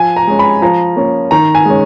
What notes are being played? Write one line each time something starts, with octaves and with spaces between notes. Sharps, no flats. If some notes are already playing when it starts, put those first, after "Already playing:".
Already playing: F3 G#5
A#5
G#3 C#4
B5
F3 A#5
A#3 C#4
D#3 A#5
G#5
G#3 C#4